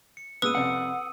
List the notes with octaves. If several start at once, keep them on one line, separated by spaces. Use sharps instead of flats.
C#7
A#2 G#3 B3 B4 D#6 E6 D#7
C2 F2 C3 F#5